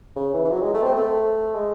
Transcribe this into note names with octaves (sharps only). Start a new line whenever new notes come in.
C#3
E3
E3
F#3
G#3
A3
C4
A3
G#3